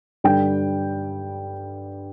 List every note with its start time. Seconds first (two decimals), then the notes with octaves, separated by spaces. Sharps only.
0.24 G2 D3 G3 D4 G5